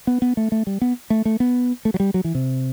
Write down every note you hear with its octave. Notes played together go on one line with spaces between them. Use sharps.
B3
B3
A3
A3
G3
B3
A3
A3
B3
A3
F#3
G3
F#3
E3
C3